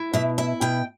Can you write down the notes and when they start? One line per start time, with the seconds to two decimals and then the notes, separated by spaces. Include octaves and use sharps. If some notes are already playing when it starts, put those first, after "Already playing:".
Already playing: E4
0.14 B2 E5
0.38 E4 E5
0.61 B2 G5